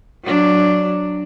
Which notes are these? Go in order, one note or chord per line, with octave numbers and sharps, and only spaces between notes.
F#3 D4